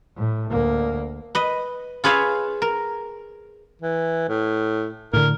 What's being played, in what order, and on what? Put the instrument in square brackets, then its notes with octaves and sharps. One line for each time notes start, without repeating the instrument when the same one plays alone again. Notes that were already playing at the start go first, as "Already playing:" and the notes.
[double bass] A2
D2 A#3
[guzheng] B4 D#5
F4 G#4 B4 C#5 E5 F5
A#4
[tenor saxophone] E3
A2
[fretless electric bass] A2 D3 [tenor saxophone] A#4